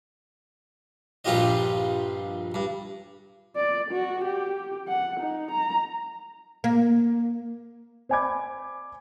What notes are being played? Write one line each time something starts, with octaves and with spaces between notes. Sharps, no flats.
A#1 G2 C4 F4 G4 D#5
G2
D5
F#4
G4
F#5
D#4
A#5
A#3
C5 D5 G#5 B5 D6 G#6